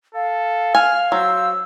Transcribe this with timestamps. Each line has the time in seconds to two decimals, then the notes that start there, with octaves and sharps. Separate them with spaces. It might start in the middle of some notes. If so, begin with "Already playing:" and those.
0.15 A4 F5
0.75 G#5 F6
1.12 F#3 C5 E6